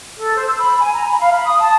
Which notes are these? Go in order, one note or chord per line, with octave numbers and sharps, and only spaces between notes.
A4
C5
E6
B5
G#5
A#5
B5
F5
B5
D#6
A5